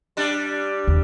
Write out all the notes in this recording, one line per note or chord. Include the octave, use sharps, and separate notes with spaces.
G3 D4
E2